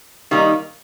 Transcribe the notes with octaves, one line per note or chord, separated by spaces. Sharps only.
D#3 G3 A#3 D#4